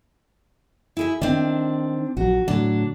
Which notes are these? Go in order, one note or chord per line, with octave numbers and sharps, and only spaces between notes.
E4 G#4 E5
D#3 C4 D4
A#1 F#3 F#4
A2 D3 F#3 D4